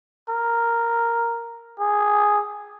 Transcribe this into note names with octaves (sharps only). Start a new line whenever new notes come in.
A#4
G#4